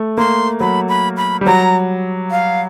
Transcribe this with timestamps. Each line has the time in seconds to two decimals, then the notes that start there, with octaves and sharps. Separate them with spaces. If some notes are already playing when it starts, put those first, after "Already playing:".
Already playing: A3
0.17 A#3 C6
0.60 F#3 B5
0.89 B5
1.17 B5
1.41 G3
1.46 F#3 A#5
2.31 F5